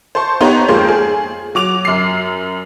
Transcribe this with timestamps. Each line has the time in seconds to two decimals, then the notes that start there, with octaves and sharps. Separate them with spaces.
0.15 C5 A5 C6 C#6
0.40 B3 D#4 G4 C5 C#5 A#5
0.68 F2 G#3 A#3 C5
0.89 G#4
1.55 F#3 D6 F7
1.85 F#2 C7